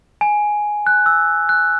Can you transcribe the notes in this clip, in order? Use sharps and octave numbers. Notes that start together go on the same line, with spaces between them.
G#5
F#6
E6
F#6